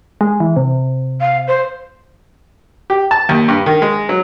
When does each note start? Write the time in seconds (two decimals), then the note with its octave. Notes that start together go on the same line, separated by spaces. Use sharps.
0.21 G#3
0.40 E3
0.56 C3
1.21 F5
1.48 C5
2.90 G4
3.11 A5
3.29 D#2
3.48 G2
3.66 D#3
3.82 G#3
4.09 F#3